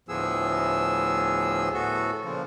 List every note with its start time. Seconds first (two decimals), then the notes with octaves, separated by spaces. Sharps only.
0.09 D2 A2 F3 B3 G#4 E6
1.74 A2 B3 F#4 A4
2.24 A#2 C#3 F3